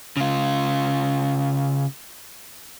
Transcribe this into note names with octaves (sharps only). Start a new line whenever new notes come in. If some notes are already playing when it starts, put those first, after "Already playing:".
C#3 F4